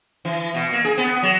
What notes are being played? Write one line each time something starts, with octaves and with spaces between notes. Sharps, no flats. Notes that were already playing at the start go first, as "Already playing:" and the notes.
E3
B2
A#3
G#4
B3
F#3